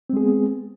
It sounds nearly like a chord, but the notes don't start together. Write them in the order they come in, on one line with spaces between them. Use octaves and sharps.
C4 G#3 G#4 B3